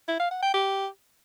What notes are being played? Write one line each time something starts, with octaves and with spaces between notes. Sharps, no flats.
E4
F5
F#5
G5
G4